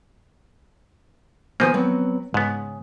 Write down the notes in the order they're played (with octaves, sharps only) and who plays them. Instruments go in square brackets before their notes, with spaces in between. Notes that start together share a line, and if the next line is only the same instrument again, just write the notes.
[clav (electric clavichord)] D#3 F3 A#3 [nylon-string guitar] B3 C5 G#5
[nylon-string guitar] F#3 B3 C4
[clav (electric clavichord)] G#2 B3 [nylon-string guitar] C#3